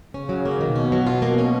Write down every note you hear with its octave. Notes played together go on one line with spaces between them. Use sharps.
C#3 C#4
F#3
A#3
B2 D#3
C#4
F#3
F4
A#3
C#4